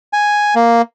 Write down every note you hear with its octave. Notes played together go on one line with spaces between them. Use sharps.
G#5
A#3